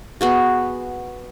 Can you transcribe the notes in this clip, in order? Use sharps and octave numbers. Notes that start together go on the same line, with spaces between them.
B3 F#4 G#4